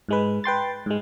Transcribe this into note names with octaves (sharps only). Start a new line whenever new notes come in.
G#2 G#3 B4
B4 G5 C6 A6
G#2 G#3